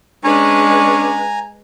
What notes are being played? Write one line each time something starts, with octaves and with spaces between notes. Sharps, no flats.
G#3 C#4 D4 B4 G#5 A#5